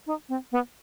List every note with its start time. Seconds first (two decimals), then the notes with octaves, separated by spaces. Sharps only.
0.07 D#4
0.29 C4
0.52 B3